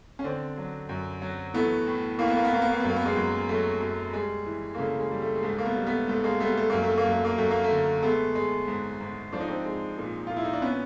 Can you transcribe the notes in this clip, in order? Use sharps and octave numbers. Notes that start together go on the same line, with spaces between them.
C#4
D3 C4 D4
F#3
F#2
F#3
E3 A3 B3
A2
A2 A#3
B3
A#3
B3
A2 A#3
B3
A#3
B3
F#2 A#3
B3
G#3 A#3
F#2
F#3 A3
F#2
G3 G#3
E3
A#3
C#3 A3
G#3
G3
A3
G#3
G#2 A3
A#3
A3 B3
G3
A3 B3
G#2 A3
G#3 A#3
G3 A3 B3
A3
F#2 A#3
A3
A#3
F#2
A3
A#3
F#2 A3
A#3
A3
D3
G#3 A3 B3
G#3
G#2
G#2
F3 D4
D#4
C4 D4
G#3
A#2
A#2 F4
E4
D#4
D4
B3 C#4